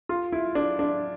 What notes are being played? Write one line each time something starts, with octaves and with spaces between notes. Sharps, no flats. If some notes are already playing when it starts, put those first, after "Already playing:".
F4
E4
D4
D4